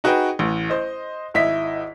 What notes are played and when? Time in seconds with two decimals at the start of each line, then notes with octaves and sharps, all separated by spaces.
0.04 D#4 F#4 G#4 B4 G5
0.39 A1
0.70 C5 D#5
1.34 G#1 E4 D#5 B6